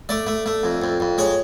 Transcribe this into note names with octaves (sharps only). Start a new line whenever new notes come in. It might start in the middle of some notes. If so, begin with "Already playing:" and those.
A3 D5
A3
A3
F2
F2
F2
G#3 C#5